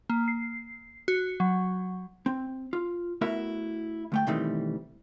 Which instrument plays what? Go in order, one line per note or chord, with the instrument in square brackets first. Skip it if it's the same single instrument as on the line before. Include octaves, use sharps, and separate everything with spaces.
[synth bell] A#3
C7
F#4
F#3
[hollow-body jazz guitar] C4
F4
A3 B3 E4 F#4 A#4 E5
D2 A3 G5
B2 D#3 E3 G3 A3 C4